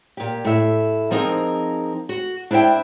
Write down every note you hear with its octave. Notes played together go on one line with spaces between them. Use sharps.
A#2 G4
A2 E5
F3 C4 D#4 G#4 A#4
F#4
D4 E4 C5 E5 G5